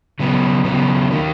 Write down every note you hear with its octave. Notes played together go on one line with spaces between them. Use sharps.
C#3 F#3 B3
C#3 F#3 B3
D#3 A#3